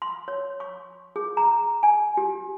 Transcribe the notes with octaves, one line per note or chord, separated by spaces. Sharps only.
C6
C#5
C#6
G#4
A#5
G#5
G4